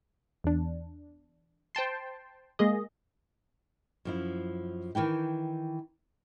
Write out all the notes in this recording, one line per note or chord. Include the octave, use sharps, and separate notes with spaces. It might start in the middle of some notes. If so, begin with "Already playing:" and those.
E2 D4
C5 G5 A5 C6
G#3 A#3 G#4 D#5
F#2 F3 E4
D#3 E3 E4 G5